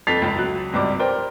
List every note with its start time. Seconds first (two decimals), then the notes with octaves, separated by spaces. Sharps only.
0.07 F2 A4 A6 B6 C7 F7
0.22 F1 C#2
0.35 C#2 F#3 F#6
0.73 G#1 C#2 G3 D6
0.99 A#4 C5 D5 G5